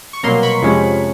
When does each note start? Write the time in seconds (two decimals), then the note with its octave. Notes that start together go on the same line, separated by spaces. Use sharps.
0.13 C#6
0.23 C2 B2 F#3 A#3 A#5 C6
0.43 B5 C#6
0.62 F2 C3 F3 G#3 C#4